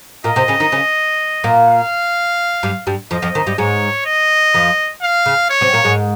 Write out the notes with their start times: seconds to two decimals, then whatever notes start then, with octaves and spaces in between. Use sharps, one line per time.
0.24 A#2 A#3 D#5
0.36 C3 C4
0.48 C#3 C#4
0.60 D#3 D#4
0.72 C#3 C#4
1.44 A#2 A#3
1.68 F5
2.63 G2 G3
2.87 G2 G3
3.11 F2 F3 D#5
3.22 F2 F3
3.35 D#2 D#3
3.47 G2 G3
3.58 G#2 G#3 C#5
4.06 D#5
4.54 F2 F3
5.02 F5
5.26 C#3
5.50 C#5
5.61 C3 C4
5.73 A#2 A#3
5.85 G#2 G#3